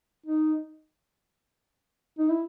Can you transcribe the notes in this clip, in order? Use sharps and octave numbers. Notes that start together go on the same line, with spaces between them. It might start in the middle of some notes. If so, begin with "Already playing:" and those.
D#4
D#4
E4